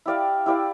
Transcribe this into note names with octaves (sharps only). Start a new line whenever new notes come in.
E4 G4 D5 F5
E4 G4 D5 F5